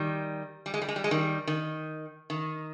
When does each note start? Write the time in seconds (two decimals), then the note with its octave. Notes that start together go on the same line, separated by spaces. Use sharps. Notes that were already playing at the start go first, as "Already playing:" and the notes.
Already playing: D#3 G3
0.66 G3
0.74 G#3
0.82 G3
0.89 G#3
0.96 G3
1.04 G#3
1.11 D#3 G3
1.47 D#3
2.30 D#3